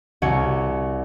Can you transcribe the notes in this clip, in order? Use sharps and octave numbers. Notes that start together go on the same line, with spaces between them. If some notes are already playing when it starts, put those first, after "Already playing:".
C2 F#4 C#5 C#7